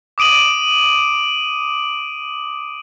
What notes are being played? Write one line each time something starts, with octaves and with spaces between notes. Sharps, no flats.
D6 D#6 D7 D#7 F#7